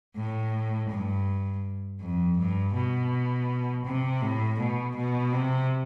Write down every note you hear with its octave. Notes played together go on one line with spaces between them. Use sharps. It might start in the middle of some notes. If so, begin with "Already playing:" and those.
A2
G2
F2
G2
B2
C3
A2
B2
B2
C3